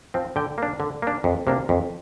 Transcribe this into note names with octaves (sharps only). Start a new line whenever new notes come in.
F3 C4
D3 G5
A#3 D4
D3
A#3 D4
F2
C3 A#3 D4
F2